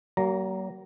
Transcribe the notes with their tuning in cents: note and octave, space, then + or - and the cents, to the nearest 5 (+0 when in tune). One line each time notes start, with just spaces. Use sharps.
F#3 +40 A#3 +0 A#5 +0